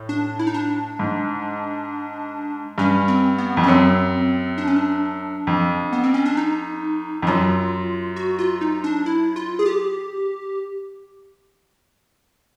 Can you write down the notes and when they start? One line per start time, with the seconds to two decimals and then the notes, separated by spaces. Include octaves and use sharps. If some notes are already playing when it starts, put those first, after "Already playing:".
Already playing: A2
0.09 D4
0.39 E4
0.47 D#4
0.54 D4
0.99 G#2
2.78 G2 C#4
3.08 C4
3.38 B3
3.57 F2
3.63 C#4
3.68 F#2 C4
4.58 D4
4.67 C#4
4.76 D4
5.47 F2
5.93 B3
6.04 C4
6.14 C#4
6.26 D4
6.37 D#4
7.22 F2
7.27 F#2 F4
8.16 F#4
8.39 F4
8.61 D#4
8.84 D4
9.06 E4
9.36 F4
9.59 G#4
9.66 G4